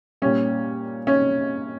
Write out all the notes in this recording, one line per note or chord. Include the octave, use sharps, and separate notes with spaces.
A#2 G3 C#4
C#4